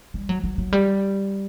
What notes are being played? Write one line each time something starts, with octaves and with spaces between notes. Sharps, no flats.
G3
F#3
F#3
F#3
G3